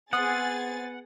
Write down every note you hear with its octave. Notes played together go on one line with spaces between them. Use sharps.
B3 C4 G#4 F#5 C6 D#6 A6